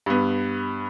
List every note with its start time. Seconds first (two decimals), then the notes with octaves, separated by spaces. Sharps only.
0.06 G2 B3